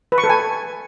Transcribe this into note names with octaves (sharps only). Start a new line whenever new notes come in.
B4
C#6
A4
G#5